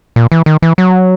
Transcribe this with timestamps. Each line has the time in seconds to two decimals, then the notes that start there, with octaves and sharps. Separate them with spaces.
0.16 A#2
0.32 E3
0.46 D#3
0.62 E3
0.78 F#3